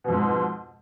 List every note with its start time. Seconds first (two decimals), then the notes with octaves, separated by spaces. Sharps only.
0.04 B2
0.08 F2
0.12 G#2